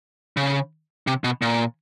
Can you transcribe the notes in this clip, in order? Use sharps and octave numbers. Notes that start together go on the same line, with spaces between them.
C#3
C3
B2
A#2